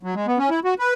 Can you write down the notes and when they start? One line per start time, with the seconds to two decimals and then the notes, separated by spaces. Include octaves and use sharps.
0.03 F#3
0.15 G#3
0.27 B3
0.38 C#4
0.50 E4
0.64 F#4
0.79 B4